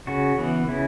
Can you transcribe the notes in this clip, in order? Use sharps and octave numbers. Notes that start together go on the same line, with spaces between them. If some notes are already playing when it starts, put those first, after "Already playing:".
C#3 F#4
E3 B3
C#3 E4